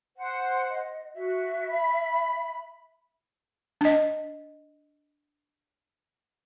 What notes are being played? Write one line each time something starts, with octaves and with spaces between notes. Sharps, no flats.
C5 F#5
D#5
F#4 E5
B5
D4 D#5